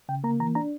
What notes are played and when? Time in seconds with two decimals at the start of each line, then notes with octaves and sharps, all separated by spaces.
0.09 C#3 G5
0.24 A#3 A#5
0.40 E3 A#5
0.55 D4 A#5